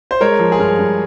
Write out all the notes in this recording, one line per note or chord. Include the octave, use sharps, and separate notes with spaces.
C5
G#3 A#4 C#5
F3
G#4
G2 A#4
G2